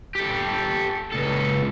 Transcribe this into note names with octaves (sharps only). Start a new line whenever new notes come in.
G4 A4
C#2 A4